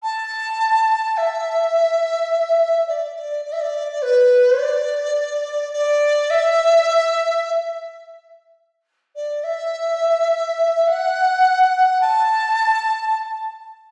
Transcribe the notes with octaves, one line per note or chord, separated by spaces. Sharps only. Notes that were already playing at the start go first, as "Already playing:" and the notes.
A5
E5
D5
D5
D5
E5
D5
D5
B4
D5
D5
E5
D5
E5
F#5
A5